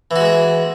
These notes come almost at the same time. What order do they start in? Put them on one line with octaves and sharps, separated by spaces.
E3 F#4 G#3 G#4